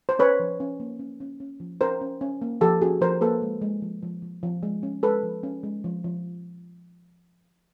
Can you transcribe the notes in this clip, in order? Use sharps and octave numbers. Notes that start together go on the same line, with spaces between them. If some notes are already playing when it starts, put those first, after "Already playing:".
C5
C#4 B4 C#5
F3
C#4
A#3
C#4
C#4
C#4
F3
C#4 A#4 C5
C#4
C#4
A#3
F3 G4 A4
C#4 F#4 G#4
F3 A#4 C5
A#3 A4 B4
G#3
G#3
F3
F3
F3
F3
G#3
C#4
G#3 A4 B4
F3
C#4
G#3
F3
F3